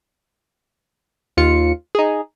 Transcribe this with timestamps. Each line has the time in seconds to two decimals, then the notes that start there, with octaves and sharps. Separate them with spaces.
1.37 D#2 F4 C#7
1.95 D#4 G#4